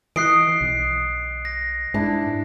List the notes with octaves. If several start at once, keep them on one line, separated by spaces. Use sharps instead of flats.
E3 D#5 F#6 C7 D7
B1
A#6
G#2 D4 E4